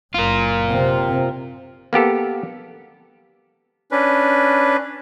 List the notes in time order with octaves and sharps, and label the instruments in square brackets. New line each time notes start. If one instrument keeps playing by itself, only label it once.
[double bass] F#1 [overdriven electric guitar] F4 A#4
[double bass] C3 C4
[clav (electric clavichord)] A#3 B3 G4 A4
[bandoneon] C#4 D4 B4